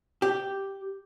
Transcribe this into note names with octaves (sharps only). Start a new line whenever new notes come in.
G4